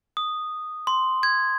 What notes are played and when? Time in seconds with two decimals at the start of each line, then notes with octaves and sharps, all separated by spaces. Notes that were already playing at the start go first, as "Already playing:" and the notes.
0.17 D#6
0.87 C6
1.23 G#6